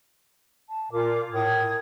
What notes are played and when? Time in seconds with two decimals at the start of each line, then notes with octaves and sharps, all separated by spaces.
0.69 A5
0.92 A#2 F4 A#4 D6
1.32 A2 A#4 D#6 G#6